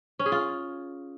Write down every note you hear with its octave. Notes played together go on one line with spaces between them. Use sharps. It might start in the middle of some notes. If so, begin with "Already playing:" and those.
C#4
G#4
F4